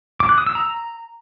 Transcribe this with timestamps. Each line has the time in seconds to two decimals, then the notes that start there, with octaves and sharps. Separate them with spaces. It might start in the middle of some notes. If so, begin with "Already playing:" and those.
0.20 D6
0.29 F#6
0.38 D#6
0.47 E6
0.55 A#5